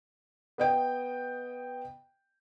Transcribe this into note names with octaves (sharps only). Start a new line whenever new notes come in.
B3 D#5 G5